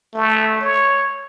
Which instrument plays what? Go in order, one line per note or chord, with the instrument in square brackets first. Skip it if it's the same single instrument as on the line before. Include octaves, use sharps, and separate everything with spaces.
[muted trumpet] A3
C#5